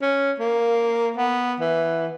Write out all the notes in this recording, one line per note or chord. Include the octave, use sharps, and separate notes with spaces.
C#4
A#3
B3
E3